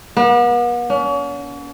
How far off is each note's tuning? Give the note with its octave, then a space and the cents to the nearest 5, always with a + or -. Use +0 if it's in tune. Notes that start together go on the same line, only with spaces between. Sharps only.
B3 -45
C#4 +40